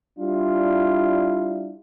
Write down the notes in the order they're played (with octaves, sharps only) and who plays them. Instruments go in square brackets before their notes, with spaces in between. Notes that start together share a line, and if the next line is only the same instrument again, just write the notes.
[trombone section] G3 D4 E4 F4